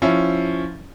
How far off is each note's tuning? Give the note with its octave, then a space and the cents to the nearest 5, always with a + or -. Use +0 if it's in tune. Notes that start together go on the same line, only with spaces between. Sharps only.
F3 +0 C#4 +0 E4 +0